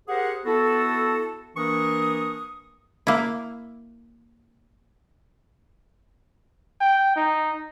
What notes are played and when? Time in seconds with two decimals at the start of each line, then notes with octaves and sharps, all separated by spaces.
0.08 G4 G#4 A#4 C5 F#5
0.46 B3 E4 F#4 A4
1.57 E3 A#3 D4 A#4 C#6 D#6
3.07 A#3 E4
6.81 G5
7.15 D#4